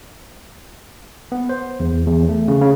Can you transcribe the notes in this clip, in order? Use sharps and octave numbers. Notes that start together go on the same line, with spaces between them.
B3
C5
E2
E2
A3
C#3
C#3